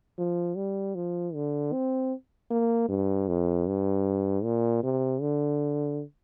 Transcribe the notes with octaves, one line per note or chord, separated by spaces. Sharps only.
F3
G3
F3
D3
C4
A#3
G2
F2
G2
A#2
C3
D3